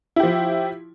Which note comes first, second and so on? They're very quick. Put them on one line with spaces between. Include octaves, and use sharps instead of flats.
E4 G4 F3